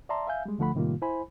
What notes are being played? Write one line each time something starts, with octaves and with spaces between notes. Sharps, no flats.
D5 E5 A5 A#5 C6
E5 F5 G#5 G6
G3 G#3
D2 D3 F3 A3 F#5 B5
A2 C3 D#3 G3 A#3 F4
E4 C5 G#5 B5